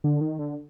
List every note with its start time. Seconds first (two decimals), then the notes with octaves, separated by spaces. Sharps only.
0.04 D3
0.21 D#3
0.39 D3